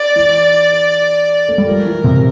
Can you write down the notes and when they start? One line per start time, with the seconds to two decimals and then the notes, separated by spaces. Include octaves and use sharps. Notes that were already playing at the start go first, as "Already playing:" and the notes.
Already playing: D5
0.16 E3
1.49 A3
1.58 G3
1.67 F3 A#4
1.85 E3
2.04 C3